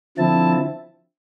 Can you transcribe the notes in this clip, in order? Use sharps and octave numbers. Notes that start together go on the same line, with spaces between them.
D3 F3 C4 E4 A5